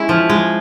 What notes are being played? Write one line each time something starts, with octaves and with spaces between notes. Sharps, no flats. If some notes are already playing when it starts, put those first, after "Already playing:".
Already playing: G#3 C#4 E4
F3
G#3